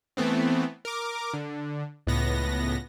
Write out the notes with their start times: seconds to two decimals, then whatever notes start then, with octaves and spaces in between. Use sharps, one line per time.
0.17 E3 A3 B3 C4
0.85 A#4 D6
1.34 D3
2.07 C#2 A2 B3 A#6